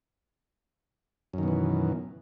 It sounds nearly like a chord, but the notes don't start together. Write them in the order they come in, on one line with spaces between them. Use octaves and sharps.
F#2 D#3 B2 E3